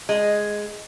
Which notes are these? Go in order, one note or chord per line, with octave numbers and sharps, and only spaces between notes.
G#3